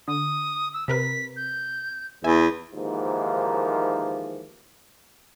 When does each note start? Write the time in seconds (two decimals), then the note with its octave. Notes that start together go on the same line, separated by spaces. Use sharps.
0.08 D3 D#6
0.74 E6
0.88 C3 A#4 B4 B6
1.36 G6
2.24 E2 E5 G#5
2.75 D#2 G#2 E3 F3 A#3